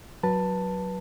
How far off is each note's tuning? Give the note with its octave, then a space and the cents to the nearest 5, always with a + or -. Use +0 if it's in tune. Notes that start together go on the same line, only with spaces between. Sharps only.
F#3 +0 B4 -20 A5 +10